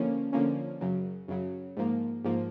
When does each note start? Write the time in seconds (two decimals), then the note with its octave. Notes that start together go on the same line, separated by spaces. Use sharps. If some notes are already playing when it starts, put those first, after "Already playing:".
Already playing: D3 F3 A#3 C#4
0.33 D3 F3 A#3 C#4
0.81 F#2 C#3 F#3
1.28 F#2 C#3 F#3
1.77 G#2 F3 A#3
2.24 G#2 F3 A#3